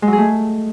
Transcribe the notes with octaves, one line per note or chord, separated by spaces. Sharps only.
G#3
F#3
G#4
A3